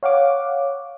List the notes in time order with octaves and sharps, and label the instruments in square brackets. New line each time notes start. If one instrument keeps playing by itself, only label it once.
[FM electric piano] C#5 F5 F#5 D6